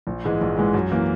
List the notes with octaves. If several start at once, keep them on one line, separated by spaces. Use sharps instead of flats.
A#1
G#2 E3 G#3
A#1
G#2 E3 G#3
F#2
E3 A#3